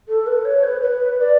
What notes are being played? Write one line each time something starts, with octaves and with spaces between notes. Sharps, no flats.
A4
B4
C#5
B4
B4
D5